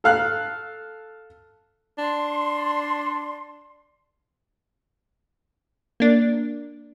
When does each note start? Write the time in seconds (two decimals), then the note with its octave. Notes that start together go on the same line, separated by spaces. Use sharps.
0.04 A4 F5 F#6
1.98 D4 C6
6.00 A#3 D4